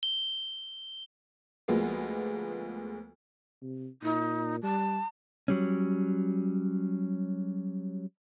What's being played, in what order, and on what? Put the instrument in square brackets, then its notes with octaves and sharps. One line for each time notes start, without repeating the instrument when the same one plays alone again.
[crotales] G7
[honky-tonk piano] D2 F3 G#3 A#3 B3
[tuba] C3
[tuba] A#2 [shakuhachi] D#4
[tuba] G3 [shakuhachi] A5
[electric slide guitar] F#3 G3 C#4